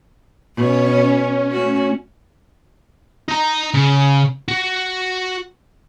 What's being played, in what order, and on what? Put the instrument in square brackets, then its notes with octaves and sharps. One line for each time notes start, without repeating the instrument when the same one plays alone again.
[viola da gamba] B2 C#5 [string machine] C#4
[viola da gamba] A3 F#4
[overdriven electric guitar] D#4 A#5
C#3
F#4